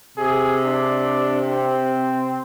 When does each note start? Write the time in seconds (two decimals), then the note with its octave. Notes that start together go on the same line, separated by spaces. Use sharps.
0.18 C3 G#4
0.65 D4
1.43 C4